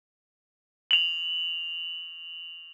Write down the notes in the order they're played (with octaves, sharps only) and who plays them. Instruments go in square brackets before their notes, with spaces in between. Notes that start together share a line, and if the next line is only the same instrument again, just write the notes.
[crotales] F7 F#7